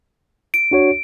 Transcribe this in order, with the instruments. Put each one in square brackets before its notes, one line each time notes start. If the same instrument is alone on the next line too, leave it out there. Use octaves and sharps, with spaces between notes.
[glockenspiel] D7
[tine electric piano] D4 F#4 C#5